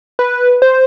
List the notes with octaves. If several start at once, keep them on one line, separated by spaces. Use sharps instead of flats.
B4
C5